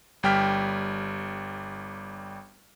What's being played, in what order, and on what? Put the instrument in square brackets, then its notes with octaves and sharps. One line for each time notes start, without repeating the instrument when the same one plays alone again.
[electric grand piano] G1 G3 G5 F6 B6